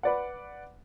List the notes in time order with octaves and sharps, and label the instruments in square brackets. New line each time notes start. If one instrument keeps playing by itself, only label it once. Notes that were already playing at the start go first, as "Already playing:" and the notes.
[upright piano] B4 D5 F#5